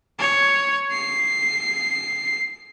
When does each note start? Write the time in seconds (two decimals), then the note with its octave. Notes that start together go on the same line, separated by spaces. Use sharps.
0.20 C#5
0.92 C7